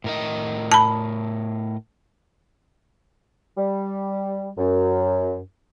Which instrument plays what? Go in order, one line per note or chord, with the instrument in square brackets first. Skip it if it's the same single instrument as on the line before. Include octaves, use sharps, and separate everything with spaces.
[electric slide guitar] A2 A#4 D#5
[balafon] A5 B5
[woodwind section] G3
F#2